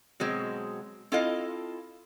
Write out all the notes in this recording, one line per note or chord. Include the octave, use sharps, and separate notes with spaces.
B2 F#3 G#3 C4
C4 E4 F4 A4 D#5 F5